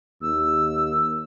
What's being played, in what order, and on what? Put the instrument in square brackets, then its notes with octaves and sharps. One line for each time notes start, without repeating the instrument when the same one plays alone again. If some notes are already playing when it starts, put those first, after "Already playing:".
[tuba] D#2 [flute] E6